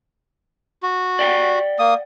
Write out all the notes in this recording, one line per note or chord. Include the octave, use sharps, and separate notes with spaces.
F#4
D5 F#5 G5
A#3 D#6